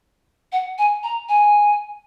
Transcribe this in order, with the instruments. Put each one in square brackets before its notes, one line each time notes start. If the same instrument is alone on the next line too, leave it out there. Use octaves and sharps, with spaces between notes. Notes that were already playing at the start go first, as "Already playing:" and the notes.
[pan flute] F#5
G#5
A#5
G#5